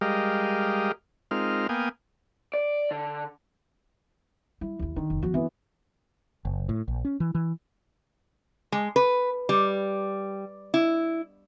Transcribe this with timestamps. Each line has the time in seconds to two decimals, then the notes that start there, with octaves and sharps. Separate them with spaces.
0.01 G3 G#3 G4 A#4 D#5 F5
1.31 G#3 C4 D#4 F4 A#4 F6
1.69 A#3 B3 F5 G5 G#5 D#6
2.54 D5
2.91 D3
4.61 G3 E4
4.79 D#2 D#3
4.96 D3 D#3
5.10 F1
5.23 F3 B3 F#4
5.34 D3 E3 B3
6.45 F#1
6.69 A2
6.88 A#1
7.05 C#4
7.20 E3
7.35 E3
8.72 G#3
8.96 B4
9.49 G3
10.74 E4